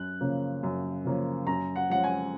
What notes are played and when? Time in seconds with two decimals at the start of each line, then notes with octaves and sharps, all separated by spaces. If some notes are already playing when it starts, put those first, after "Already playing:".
Already playing: F#2 F#6
0.21 C#3 F3 A#3 C#4
0.63 F#2
1.04 C#3 F3 A#3 C#4
1.47 F#2 A#5
1.76 F#5
1.89 F3 G#3 C#4 F#5
2.04 G#5